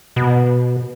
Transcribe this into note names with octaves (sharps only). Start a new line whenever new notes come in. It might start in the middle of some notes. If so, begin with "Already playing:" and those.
B2